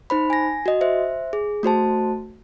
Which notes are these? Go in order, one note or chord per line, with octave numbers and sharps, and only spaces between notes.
D#4 C5 B5
G#5 A#6
F#4 D#5
C5 E5
G#4
A3 F#4 C5 A5